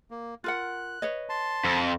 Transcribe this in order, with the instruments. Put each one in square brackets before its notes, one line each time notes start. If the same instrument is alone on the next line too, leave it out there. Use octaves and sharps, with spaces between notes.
[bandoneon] A#3
[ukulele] F4 A#4 F#5 [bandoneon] F#6
[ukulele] B4 C#5 D#5
[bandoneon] A5 C6
[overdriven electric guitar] F2